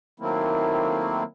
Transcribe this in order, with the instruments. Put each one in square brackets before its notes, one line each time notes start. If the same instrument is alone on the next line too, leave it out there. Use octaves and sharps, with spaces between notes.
[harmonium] D#3 F#3 A3 A#3 C4 E4